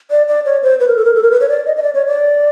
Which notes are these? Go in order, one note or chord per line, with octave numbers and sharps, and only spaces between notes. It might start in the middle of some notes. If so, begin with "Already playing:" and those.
D5
D5
C#5
C5
B4
A#4
A4
A#4
A4
A#4
B4
C#5
D5
D#5
D#5
D5
C#5
D5